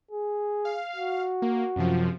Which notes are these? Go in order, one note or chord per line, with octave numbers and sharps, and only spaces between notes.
G#4
F5
F#4
A#3
F#2 C3 F3